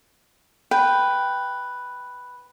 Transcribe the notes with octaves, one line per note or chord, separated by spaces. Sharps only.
B4 G5